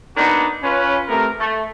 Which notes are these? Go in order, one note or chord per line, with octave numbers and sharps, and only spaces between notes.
A#3 B3 D4 D#4 F#4 B4
C#4 F4 B4
C3 A3 B3 A#4
A3